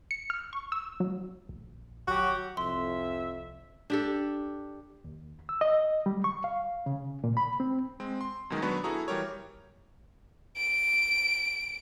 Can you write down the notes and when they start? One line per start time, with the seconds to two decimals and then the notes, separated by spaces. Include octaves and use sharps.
0.11 C#7
0.30 F6
0.53 C#6
0.72 E6
1.00 F#3
1.49 A#1
2.08 G#1 F#3 F#4 G4
2.57 C2 F2 E5 C6
3.90 D4 G4 A4
5.05 D#2
5.49 E6
5.61 D#5
6.06 G3
6.24 C#6
6.44 F5
6.86 C#3
7.24 A#2
7.37 B5
7.60 C4
8.00 G#3 C4
8.21 C6
8.50 F#2 B2 D#3 G#3
8.62 F#3 B3 D4 B4 B5 C#6
8.84 E4 F#4 G#4 A4 A#5 D#6
9.08 E3 G3 G4 A#4 C#5
10.57 D7